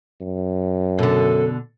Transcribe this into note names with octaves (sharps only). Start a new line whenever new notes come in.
F#2
B2 D3 A4